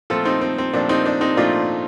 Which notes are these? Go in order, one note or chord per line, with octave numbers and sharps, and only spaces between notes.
A#2 F3 A3 C4 F4 A4
C4 D#4
C4
C4
A#2 F3 A3 C4 D4
C4 D#4
D4
C4 D#4
A#2 F3 A3 C4 D4 F4